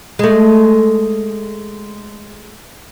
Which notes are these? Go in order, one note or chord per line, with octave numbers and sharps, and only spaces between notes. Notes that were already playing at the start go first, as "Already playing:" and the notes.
G#3 A3